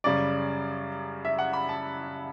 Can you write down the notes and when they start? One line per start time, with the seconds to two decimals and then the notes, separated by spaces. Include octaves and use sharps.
0.04 F#2 C#3 G3 D5
1.25 E5
1.39 F#5
1.53 B5
1.69 A5